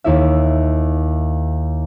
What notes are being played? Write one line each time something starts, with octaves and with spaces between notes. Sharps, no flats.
D#2 E4 E5